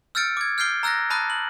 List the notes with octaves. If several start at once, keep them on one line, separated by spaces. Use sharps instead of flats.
E6 F6 G6 A6 C#7 D7
D6 G#6
F6 G6 G#6 C7 D7 G7
A#5 E6 F#6 A6 A#6
A5 B5 D#6 F#6 A6
F#7